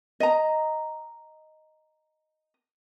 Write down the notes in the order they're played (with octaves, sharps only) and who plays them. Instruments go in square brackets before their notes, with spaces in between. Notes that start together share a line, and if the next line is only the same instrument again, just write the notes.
[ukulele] D#5 A#5